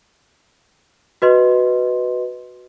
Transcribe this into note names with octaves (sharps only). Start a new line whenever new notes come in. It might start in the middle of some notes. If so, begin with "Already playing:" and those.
F#4 B4 D#5 C6